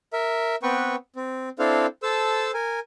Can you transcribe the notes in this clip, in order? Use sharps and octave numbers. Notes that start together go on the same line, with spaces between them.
A#4 E5
B3 C4 B4 G5 C#6
C4
C4 D4 E4 A4 C5 F5
A4 C5 A5 E6
A#4 G#5